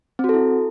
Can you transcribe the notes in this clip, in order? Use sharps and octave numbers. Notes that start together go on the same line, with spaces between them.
C4 E4 F#4 A4